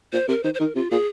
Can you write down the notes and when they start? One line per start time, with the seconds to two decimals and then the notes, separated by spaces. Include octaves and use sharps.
0.13 A#2 C5
0.28 C3 A#4
0.43 D#3 C5
0.54 C5
0.60 D#3 A#4
0.75 C3 F4
0.91 A#2 G#4